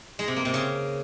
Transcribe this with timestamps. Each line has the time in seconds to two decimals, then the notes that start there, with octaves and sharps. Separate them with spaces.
0.19 G#3
0.28 C3
0.36 A#3
0.45 C3
0.54 C#3